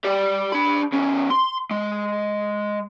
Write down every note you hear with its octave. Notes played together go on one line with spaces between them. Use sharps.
G4 D5
D4 B5
E2 C#4
C6
G#3